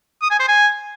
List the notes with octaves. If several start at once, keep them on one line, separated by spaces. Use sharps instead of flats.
D#6
G#5
C5
G#5